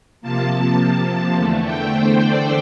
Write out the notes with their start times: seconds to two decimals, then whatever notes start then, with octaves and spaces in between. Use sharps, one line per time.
0.21 C3 F3 A#3 A5
0.78 A5
1.36 E2 D3 A3
1.64 G5
1.92 C5
2.21 D5